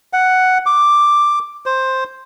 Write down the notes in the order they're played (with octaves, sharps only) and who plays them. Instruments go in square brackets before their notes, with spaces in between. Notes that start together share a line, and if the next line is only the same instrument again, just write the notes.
[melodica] F#5
D6
C5